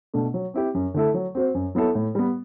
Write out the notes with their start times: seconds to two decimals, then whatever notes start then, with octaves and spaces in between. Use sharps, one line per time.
0.14 B2 A3 D4
0.34 F#3
0.54 C4 E4 G4
0.74 F#2
0.94 D3 A3 E4 A4
1.14 F#3
1.35 C4 F#4 C5
1.54 F#2
1.75 F#3 B3 E4 A4
1.95 A2
2.15 G3 B3